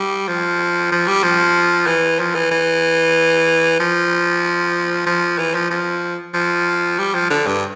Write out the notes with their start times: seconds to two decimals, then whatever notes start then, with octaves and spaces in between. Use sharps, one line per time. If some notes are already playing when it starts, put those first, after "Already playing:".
Already playing: G3
0.28 F3
0.92 F3
1.08 G3
1.23 F3
1.87 E3
2.19 F3
2.35 E3
2.51 E3
3.79 F3
5.06 F3
5.38 E3
5.55 F3
5.71 F3
6.34 F3
6.99 G3
7.14 F3
7.30 D3
7.46 G2